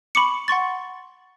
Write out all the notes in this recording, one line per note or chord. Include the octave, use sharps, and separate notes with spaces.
B5 C#6 D6 C#7
F#5 C6 C#6 A6